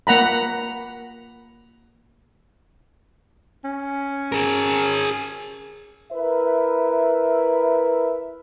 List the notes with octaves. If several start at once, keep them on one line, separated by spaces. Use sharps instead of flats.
A#3 F#5 A#5 B5
C#4
G#4 A#4
E4 A#4 B4 E5